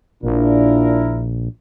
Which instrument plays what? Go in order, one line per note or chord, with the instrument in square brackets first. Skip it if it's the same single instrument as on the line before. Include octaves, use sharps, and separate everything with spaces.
[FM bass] A#1 [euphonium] A#2 [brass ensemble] D4 E4 A#4